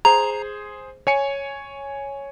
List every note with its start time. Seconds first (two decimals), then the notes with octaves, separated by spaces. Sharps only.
0.05 G#4 C5 A#5
1.07 C#5 G#5 C#7